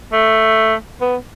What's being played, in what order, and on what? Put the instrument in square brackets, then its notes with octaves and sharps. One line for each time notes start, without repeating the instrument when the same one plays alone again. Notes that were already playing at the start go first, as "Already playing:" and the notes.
[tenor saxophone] A3
B3